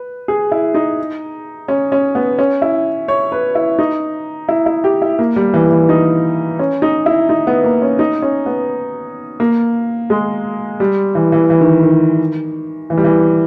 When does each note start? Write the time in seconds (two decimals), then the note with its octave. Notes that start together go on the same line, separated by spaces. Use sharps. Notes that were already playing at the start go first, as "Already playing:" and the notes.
Already playing: B4
0.28 G#4
0.52 E4
0.74 D#4
1.68 C#4
1.92 C#4
2.15 B3
2.39 C#4
2.62 E4
3.08 C#5
3.32 B4
3.55 E4
3.79 D#4
4.49 E4
4.66 E4
4.84 G4
5.02 E4
5.19 A#3
5.36 G3
5.54 E3
5.71 E3
5.89 D#4
6.59 C#4
6.82 D#4
7.06 E4
7.29 D#4
7.47 B3
7.64 A#3
7.82 C#4
7.99 D#4
8.22 C#4
8.46 B3
9.40 A#3
10.10 G#3
10.80 G3
11.15 E3
11.32 E3
11.50 E3
11.61 D#3
11.83 D#3
12.90 E3
12.97 G3
13.04 E3